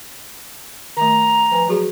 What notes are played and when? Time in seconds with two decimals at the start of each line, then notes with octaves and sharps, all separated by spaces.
0.97 D#3 A3 A#5
1.52 F3 B4 G#5
1.68 F#3 F#4 G#4